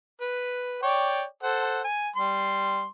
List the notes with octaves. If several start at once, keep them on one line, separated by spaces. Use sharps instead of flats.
B4
C#5 D5 G5
A4 C5 F#5
G#5
G3 C6